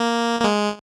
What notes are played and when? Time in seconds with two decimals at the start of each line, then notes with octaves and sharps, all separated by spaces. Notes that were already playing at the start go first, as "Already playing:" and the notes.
Already playing: A#3
0.40 A#3
0.44 G#3